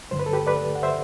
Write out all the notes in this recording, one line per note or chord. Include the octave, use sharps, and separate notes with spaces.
G2 D3 F#3 C5
B4
A4
G4 B4
B4 D5
F#5
C5 E5